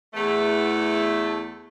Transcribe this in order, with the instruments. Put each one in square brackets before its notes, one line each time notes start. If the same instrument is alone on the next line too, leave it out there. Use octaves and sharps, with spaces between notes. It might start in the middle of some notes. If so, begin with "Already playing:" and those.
[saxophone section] E2 A3